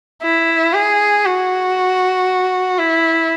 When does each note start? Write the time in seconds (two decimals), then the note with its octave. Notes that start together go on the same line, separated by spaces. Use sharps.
0.22 E4
0.73 G#4
1.25 F#4
2.78 E4